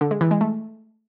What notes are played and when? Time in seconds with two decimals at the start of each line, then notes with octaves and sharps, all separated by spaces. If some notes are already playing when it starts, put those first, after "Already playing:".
0.01 D3
0.11 G#3
0.21 E3
0.31 G#3
0.41 A3